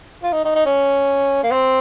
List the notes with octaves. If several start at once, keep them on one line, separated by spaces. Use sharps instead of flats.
F4
D#4
D#4
D#4
C#4
A#3
C4